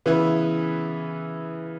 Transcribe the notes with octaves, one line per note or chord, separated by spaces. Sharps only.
C#3 E3 B3 E4 B4